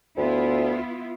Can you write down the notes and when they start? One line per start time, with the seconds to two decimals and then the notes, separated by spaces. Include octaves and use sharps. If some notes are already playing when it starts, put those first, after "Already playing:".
0.17 D2 B3 E4 F4